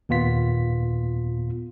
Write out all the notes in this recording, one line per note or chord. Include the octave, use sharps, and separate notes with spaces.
D#2 A#2 B3 F4 B6